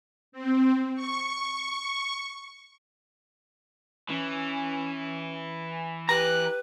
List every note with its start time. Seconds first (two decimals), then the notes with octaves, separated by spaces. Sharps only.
0.32 C4
0.95 C#6
4.09 E3 C#4
6.09 G4 B4 A#5 F#6